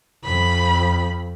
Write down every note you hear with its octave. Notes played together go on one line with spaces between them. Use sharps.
F2 B5